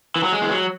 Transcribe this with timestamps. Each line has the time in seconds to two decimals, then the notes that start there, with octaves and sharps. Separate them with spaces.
0.16 E3
0.23 F#3
0.32 G#3
0.42 E3
0.51 F#3